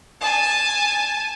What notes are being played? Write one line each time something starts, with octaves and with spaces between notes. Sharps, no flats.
G#5 A5